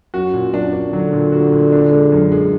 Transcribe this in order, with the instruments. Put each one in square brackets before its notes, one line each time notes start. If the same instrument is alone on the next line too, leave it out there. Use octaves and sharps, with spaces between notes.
[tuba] F#2 [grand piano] F#4
[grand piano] A#2
[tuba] F#2 [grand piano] D4
[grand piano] D4
[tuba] D3 [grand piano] F#3
[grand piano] A#2
F#4
A#2
D4
G#3
F#2
G#3